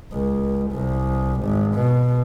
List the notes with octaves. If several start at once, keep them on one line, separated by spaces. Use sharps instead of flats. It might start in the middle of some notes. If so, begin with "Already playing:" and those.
C#2
C2
G#1
B2